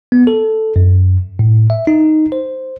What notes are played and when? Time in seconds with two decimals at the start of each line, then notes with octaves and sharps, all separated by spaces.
0.12 B3
0.27 A4
0.76 F#2
1.39 A2
1.70 E5
1.87 D#4
2.32 C5